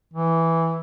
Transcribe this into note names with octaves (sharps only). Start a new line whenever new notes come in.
E3